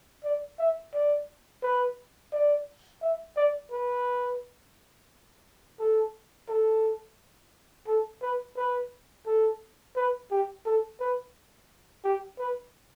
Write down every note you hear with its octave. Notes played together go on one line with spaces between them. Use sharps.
D5
E5
D5
B4
D5
E5
D5
B4
A4
A4
A4
B4
B4
A4
B4
G4
A4
B4
G4
B4